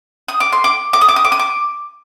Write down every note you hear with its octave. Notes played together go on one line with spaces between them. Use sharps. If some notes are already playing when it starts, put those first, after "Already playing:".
D#6
D6
C6
D6
D6
D#6
D6
D#6
D6
D#6
D6